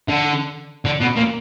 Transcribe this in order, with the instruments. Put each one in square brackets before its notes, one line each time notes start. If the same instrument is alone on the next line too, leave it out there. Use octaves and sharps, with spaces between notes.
[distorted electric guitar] D3
D3
B2
A#2